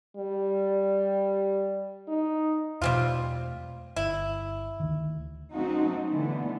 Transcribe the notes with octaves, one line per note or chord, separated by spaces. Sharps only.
G3
D#4
E2 B2 G3 A3 C4 F4
G1 E4
D2 D#3
F#3 A3 C4 C#4 D#4 F#4
D3 E3 A3 B3